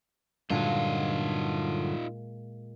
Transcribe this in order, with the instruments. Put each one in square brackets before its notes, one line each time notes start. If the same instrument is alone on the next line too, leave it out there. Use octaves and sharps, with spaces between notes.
[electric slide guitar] G2 D3 F#3 [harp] A#2 G#3 [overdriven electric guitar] D#4 F4